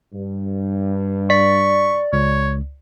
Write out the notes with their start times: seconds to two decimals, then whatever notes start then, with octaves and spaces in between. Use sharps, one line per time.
0.13 G2
1.30 D5 C#6 B6
2.13 C#2 C#5